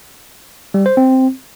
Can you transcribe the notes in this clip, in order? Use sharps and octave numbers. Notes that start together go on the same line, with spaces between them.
G3
C5
C4